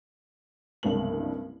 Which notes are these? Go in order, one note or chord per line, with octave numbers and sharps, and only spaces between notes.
F#1 C2 G2 G#3 B3 F#7